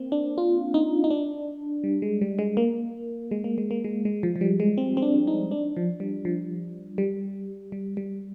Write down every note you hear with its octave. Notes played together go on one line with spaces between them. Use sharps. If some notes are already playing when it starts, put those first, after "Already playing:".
Already playing: A#3 C4
D4
F4
D#4
D#4
D4
G3
G#3
G3
G#3
A#3
G#3
A#3
G#3
A#3
G#3
G#3
F3
F3
G3
G#3
C4
C4
D4
D#4
D4
F3
G3
F3
G3
G3
G3